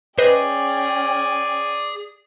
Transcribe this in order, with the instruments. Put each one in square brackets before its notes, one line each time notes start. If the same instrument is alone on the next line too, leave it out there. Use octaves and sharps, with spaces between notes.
[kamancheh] C#4 G5 [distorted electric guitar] G#4 [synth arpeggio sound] B4 C5 D#5 [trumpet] D5